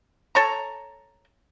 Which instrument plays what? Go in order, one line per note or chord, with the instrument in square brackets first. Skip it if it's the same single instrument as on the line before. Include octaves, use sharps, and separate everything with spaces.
[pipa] A4 C#5 A#5